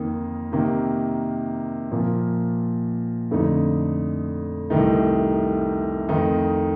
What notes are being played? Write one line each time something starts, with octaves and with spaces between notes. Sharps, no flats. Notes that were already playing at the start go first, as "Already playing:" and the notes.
Already playing: F2 D#3 A#3 D#4
C3 D#3 A#3
A#2 F3 A#3
F2 D3 A3 D#4
C2 C3 D#3 A3 D#4
F2 D#3 A3 D#4